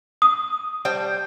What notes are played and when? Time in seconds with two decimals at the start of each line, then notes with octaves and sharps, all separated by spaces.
0.22 D#6
0.85 G3 C5 G5